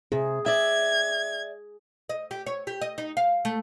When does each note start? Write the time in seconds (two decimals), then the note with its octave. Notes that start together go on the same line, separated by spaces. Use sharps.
0.12 C3 G#4
0.46 D5 E5 G#6
2.09 D#5
2.31 G4
2.46 C#5
2.67 G4
2.81 D#5
2.98 D#4
3.17 F5
3.45 A3